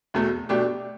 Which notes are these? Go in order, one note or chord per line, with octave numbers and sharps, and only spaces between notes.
E2 B2 A3
B2 A3 D4 G4